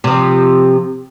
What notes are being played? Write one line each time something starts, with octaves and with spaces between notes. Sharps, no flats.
C3 F3